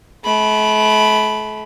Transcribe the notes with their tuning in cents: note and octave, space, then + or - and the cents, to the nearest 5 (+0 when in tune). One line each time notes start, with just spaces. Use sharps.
A3 -40 B5 +0